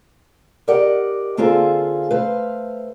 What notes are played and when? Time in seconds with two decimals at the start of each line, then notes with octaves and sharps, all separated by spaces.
0.68 G4 A#4 D5 D#5 F#5
1.37 D3 A#3 C4 F4 G#4 A4
2.11 A3 B4 C5 F5